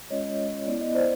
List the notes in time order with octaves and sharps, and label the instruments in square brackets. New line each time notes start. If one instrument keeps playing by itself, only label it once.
[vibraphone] G#3 C#4 F4 C#5 D#5
B3 E4 D5
D#5
C5 D5